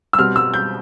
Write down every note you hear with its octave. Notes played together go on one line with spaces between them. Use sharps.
E6
B2 G3 C4 F6
E6
G6